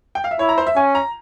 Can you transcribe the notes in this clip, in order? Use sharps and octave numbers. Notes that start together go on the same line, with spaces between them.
G5
F5
E5
E4 C#5
A#5
C5
E5
C#4 G#5
A#5